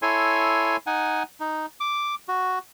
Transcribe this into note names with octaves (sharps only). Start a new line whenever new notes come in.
E4 A4 C#5 G#5 C6
D#4 F#5 G#5
D#4
D6
F#4